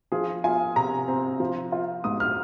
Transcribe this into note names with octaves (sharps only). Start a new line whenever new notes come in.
F3 G#4
F4 G#5
C3 A#5
C4
F3
F4
G#2 D#6
F6